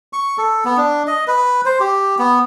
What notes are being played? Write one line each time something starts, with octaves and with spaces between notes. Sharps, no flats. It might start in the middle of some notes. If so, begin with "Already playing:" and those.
C#6
A4
B3
D4
D#5
B4
C5
G4
B3